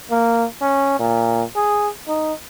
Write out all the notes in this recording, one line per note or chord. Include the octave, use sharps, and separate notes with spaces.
A#3
C#4
A#2
G#4
D#4